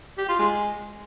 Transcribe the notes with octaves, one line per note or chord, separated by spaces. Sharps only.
G4
F4
G#3